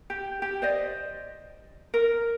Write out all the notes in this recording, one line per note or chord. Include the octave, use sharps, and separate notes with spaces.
G4
G4
C5 D5 D#5
A#4